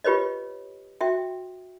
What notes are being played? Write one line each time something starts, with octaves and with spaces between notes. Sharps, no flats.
F4 G4 B4 C#5 D#5
F#4 E5 G5